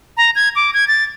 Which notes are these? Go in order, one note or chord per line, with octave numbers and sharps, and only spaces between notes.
A#5
G#6
D6
G#6
A6